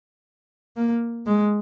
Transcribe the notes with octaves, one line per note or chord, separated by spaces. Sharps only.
A#3
G#3